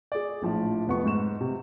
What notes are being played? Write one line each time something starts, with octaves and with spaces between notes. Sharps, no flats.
G#4 D5
A#1 A2 F3 A5
F1 B3 C#6
G#2 E7
C3